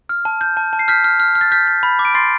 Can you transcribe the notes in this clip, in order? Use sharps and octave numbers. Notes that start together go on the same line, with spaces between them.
F6
A5
G6
A5
A5
C7
F6 G6 B6
F6
F6
F6
A6
F6 G6 B6
F6
B5
D6
D7
C6 A6 C7